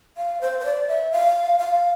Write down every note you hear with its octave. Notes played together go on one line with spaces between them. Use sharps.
F5
C5
C5
D5
E5
F5
F5